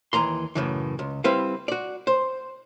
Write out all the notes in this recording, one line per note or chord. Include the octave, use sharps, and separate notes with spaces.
D#2 E3 A#5 C6
F#2 A2 C#3 E3
C#2
G3 C4 E4 B4 F5
F#4 D5
C5